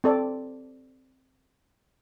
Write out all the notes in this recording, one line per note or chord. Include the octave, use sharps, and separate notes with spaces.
C4 A4 D5